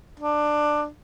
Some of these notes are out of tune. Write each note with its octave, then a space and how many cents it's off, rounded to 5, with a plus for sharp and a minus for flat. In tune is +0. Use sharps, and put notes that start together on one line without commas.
D4 +15